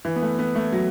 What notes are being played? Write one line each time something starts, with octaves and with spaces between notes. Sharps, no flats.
E3
B3
A3
B3
A3
F#3